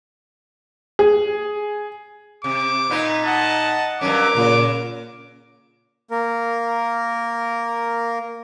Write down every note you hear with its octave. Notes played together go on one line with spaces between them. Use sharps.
G#4
C3 D6
A#2 B3 D#4
D#5 F#5 A5
G2 F#3 C#4 A#4 D6
A#2 C#3
A#3 A#4